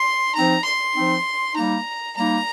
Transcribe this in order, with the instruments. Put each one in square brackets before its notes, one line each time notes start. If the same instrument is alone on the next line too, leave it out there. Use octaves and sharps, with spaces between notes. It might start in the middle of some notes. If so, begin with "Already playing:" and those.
Already playing: [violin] C6
[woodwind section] F3 C4 D#4 [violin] A#5
[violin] C6
[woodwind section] F3 C4 D#4
[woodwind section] G3 A#3 D#4 [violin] A#5
[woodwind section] G3 A#3 D#4 [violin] A#5